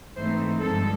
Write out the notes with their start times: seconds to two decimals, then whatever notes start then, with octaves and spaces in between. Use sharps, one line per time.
0.15 G#2 E3 A3 C4 D#4 C5
0.61 G2 D3 F3 G#3 A4